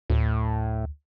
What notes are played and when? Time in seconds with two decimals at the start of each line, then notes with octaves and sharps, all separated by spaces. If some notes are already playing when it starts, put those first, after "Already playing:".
0.10 D2 A2